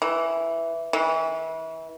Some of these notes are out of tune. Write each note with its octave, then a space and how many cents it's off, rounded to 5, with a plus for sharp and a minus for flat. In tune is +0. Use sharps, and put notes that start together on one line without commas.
E3 +5
E3 -30